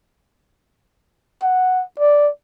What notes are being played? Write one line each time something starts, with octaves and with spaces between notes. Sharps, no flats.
F#5
D5